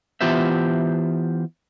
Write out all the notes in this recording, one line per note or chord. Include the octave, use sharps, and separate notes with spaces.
E3 B3 F4 G4 C5 E5